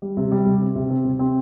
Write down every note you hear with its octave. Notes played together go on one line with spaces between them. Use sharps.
G3
C3
G3
C3
C4
C3
C4
C3
C4